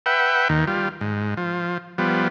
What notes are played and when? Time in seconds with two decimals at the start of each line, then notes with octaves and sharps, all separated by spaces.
0.06 B4 E5 F#5 G5
0.49 D#2 D#3
0.67 G3 F4
1.01 G#2
1.37 F3
1.98 F3 G3 B3